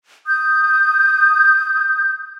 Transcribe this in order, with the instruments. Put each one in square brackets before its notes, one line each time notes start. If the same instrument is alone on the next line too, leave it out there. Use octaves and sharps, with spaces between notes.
[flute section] D#6 G6